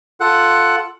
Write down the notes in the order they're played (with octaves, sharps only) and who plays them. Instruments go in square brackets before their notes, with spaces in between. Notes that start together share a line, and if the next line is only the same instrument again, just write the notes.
[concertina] F4 A4 F#5 F#6